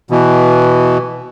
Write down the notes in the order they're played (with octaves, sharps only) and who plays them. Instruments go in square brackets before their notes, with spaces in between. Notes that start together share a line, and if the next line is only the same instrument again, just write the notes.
[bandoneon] B2 E3